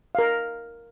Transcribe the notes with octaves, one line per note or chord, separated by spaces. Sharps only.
A#4 F5